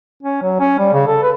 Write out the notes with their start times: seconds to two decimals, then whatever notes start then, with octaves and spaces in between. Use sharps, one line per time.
0.23 C#4
0.43 F#3
0.60 C#4
0.79 G3
0.93 C#3
1.07 A4
1.22 B4